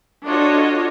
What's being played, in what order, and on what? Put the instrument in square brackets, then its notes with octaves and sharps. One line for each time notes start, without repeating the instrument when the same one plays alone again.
[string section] D4 F4 F#4 A4 C#5 D#5